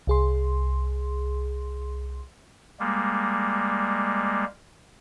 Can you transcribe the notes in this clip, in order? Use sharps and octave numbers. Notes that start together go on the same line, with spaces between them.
C2 G#4 C6
G3 G#3 A#3